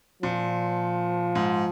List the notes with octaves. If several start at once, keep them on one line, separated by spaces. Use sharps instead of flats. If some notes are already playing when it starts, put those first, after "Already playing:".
A#2 F3
G#2